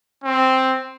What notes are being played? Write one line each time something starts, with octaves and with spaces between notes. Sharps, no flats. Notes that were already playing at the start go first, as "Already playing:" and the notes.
C4